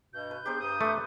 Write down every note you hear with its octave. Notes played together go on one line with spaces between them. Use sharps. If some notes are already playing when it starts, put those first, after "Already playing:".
G2 B2 G6
B4
B3 D4 G4 G#4 A#4 C5
G2 D#6
A3 B4 C6 D6